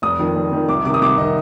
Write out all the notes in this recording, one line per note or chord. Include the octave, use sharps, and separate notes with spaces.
F1 D#6
F2 D#3
F1
F2 D#3
C2 D6
C3 D#3 D6
D#6
C2 D6
C3 D#3 D#5